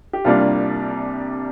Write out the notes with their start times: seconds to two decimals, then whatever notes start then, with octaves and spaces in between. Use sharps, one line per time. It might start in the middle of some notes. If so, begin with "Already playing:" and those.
0.13 G4
0.24 C2 C3 G3 A#3 D4 F4